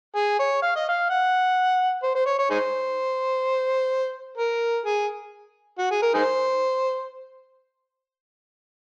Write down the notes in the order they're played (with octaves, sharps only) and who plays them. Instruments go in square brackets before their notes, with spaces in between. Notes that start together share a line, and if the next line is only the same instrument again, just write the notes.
[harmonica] G#4
C#5
F5
D#5
F5
F#5
C5
C5
C#5
C#5
D#4 G#4 C5
A#4
G#4
F#4
G#4
A#4
D#4 G#4 C5